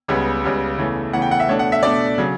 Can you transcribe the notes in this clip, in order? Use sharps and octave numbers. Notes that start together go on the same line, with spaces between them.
C#2 C#3 G3 B3
C#2 C#3 G3 B3
E2 C#3 E3 A3
E2 C#3 E3 A3 F#5
G5
F#5
E5
B2 A3 D4 C#5
F#5
E5
B2 A3 D4 D5
C#3 F#3